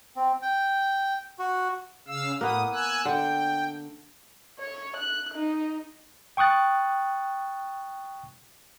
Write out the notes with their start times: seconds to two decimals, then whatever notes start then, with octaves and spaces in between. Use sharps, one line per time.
0.16 C4
0.42 G5
1.39 F#4
2.08 C#3 F5 E6
2.41 A2 A#3 B3 D#6
2.73 G#5 E6 F#6
3.05 D3 G5
4.60 C#5
4.96 F#6
5.35 D#4
6.37 G5 C#6 D#6 F#6 A6